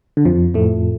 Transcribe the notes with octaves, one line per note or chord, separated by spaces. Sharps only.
D3
F2 F3
A2 A3